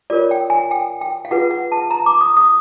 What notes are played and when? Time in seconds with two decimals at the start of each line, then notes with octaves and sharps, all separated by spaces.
0.10 F4 A#4 C#5 D5
0.31 G5
0.50 G#5
0.71 G5
1.01 G5
1.25 F5
1.31 F4 G#4 B4 F#5
1.51 F#5
1.72 A5
1.91 A#5
2.06 D6
2.21 D#6
2.37 D#6